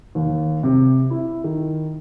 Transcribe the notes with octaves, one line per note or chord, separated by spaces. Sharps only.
D#2
C3
E4
D#3